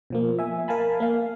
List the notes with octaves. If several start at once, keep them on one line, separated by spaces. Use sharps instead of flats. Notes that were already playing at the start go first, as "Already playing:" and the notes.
B2 F3 A#3
E5 G#5
A#4 F5 G#5 A5 B5
A#3 F5